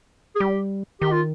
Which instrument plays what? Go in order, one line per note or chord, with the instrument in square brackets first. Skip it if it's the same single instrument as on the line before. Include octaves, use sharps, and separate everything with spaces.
[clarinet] G#4
[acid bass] G3 [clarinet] G4
[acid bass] D#3 [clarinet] G4
[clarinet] F4